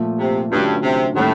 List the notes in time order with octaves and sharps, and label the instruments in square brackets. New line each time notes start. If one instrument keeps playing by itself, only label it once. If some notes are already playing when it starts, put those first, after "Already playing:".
Already playing: [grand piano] A#2 F3 A3
[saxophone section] C3
[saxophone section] G2 [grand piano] D3 F#3 A3 C#4 F4
[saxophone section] C3
[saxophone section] A2 [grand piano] D#3 G3 A#3 C#4